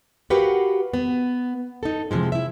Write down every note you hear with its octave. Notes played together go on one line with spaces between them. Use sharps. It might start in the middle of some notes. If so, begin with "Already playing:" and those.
F#4 G4 A#4 B4 F5 F#5
B3
D#4 A4
C3 E3 F3 G#3
E4 E5